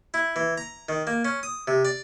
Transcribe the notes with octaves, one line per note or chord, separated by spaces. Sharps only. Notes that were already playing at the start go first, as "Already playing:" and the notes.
E4
E3
A#5
D#3
A#3
C#4
D#6
C3
D5